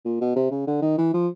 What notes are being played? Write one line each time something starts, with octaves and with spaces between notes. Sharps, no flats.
A#2
B2
C3
C#3
D3
D#3
E3
F3